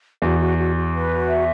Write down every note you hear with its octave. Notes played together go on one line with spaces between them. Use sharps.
E2 F#4
F#4
F#4
F#4
B4
F#4
E5